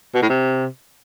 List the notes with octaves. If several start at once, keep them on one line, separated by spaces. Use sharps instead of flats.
B2
A2
C3